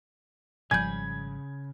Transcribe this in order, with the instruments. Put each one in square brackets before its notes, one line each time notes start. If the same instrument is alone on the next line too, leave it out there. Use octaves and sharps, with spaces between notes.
[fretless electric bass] G#1 F3 G3 [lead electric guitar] C#3 B5 [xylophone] G#5 G6 [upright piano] G#6